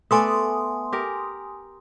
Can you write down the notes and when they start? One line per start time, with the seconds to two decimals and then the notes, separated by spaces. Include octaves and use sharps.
0.11 A3 B3 D5 G#5 C6 D#6
0.93 G4 A#4